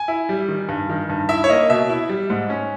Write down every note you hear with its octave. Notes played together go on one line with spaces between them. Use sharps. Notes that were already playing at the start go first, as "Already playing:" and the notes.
Already playing: G#5
E4
G3
D#3
G2
D#3
G2
E4 E5
C#5
A#3 D#5
B2 E5
E4
G3
G#2
C#4